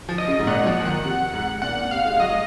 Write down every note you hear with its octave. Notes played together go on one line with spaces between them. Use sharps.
F3
D#5
C#3
G#2
A#2 F#5
F#3
F3
F3
D#3
C3
G#2
A#2 F#5
A#2
C3 F5
G#3
G#3
F#3 D#5